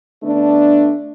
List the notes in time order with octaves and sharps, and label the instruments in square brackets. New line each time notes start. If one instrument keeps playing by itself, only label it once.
[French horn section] D3 A3 B3 D4